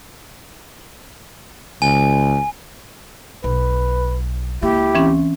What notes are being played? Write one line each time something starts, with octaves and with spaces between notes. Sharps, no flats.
C#2 G#5
B1 B4
C#2 A#3 E4 G4
E3 C4 C#4